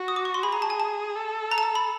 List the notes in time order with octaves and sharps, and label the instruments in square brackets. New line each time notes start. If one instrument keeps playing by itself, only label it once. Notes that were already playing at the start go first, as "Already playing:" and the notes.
Already playing: [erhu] F#4
[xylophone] D#6
D6
C#6
C6
[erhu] G#4 [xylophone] B5
[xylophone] A#5
A5
G#5
A5
[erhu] A4
[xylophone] A#5
A5
A#5
B5